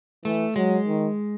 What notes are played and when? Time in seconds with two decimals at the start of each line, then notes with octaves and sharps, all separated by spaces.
0.24 E3 A3
0.56 F#3 G#3
0.87 D#3